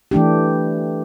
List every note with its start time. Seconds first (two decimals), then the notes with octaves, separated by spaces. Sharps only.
0.11 E3 A3 D4 G4